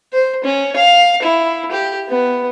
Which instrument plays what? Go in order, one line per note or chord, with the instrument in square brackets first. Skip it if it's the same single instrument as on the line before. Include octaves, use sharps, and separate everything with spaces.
[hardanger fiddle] C5
C#4
F5
E4
G4
B3